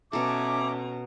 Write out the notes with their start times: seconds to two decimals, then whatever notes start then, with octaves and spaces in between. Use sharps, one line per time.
0.13 B2 C#4 A4 E5 G#5 A#5 D6